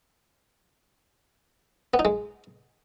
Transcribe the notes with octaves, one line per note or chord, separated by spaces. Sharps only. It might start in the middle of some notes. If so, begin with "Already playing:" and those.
B3
D#4
G#3